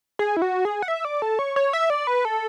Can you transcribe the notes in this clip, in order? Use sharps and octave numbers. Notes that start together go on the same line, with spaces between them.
G#4
E4
F#4
G#4
F#5
E5
D5
A4
C#5
C#5
E5
D5
B4
A4